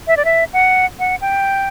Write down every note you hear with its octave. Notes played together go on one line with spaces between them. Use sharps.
E5
D5
E5
F#5
F#5
G5